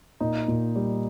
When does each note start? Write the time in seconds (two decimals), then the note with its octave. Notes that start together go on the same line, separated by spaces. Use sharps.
0.20 A#2 D#4
0.48 A#2
0.76 G3